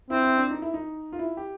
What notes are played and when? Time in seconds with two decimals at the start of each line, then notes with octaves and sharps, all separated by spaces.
0.10 C4 E4
0.24 E4
0.37 D4
0.50 D#4
0.62 E4
0.74 D#4
1.12 F4
1.19 E4
1.37 G4